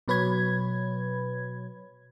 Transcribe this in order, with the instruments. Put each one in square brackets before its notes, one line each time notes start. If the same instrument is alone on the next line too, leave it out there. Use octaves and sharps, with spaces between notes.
[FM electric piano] B2 F#3 B4 C#5 B5 G#6